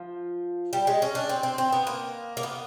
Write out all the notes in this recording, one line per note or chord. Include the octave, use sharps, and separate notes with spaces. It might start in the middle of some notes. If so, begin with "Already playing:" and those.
Already playing: F3
G3
G#3
C#4
D4
C4
C4
C4
B3
A#3
A#3
B3